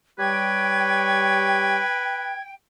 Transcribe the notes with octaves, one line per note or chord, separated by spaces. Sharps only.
G3 G4 B4 C#5 G5 G#6